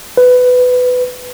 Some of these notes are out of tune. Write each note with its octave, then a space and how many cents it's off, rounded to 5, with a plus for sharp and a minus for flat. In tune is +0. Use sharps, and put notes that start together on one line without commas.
B4 +15